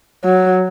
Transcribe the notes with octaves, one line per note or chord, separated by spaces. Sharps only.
F#3